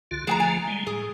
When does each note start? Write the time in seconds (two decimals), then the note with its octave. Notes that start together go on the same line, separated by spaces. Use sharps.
0.11 C2 D3 F4
0.27 D3 F3 A3 G#4 G5 A#5
0.40 G#5
0.67 G3 G#3
0.87 A2 G#4